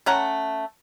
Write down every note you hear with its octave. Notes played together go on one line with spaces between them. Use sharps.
A3 C#4 F#5 A#5